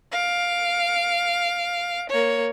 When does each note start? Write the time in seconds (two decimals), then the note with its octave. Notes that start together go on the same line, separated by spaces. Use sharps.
0.13 F5 D7
2.10 A#3 C#5